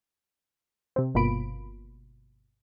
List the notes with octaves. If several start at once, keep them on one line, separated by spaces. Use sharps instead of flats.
C3 C4
G1 B2 A#3 F4 B5 D7